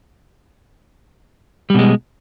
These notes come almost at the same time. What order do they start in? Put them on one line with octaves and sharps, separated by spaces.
G3 B2 G#3